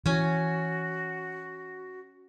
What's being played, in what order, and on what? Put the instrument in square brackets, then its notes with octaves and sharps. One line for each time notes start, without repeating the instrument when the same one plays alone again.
[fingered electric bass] E3 [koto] C#4 G#5 [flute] F#4